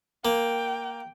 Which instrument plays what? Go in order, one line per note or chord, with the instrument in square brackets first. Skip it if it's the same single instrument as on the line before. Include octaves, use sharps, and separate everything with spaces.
[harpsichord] A#3 [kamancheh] G5